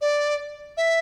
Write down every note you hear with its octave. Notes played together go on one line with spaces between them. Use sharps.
D5
E5